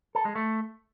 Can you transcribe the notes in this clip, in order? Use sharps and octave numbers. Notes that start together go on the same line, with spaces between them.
A4
G#3
A3